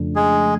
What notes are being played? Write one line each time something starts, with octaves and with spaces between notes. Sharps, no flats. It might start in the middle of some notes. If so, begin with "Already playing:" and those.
Already playing: F2 C#3 F3 A3 D4
G#3 G#4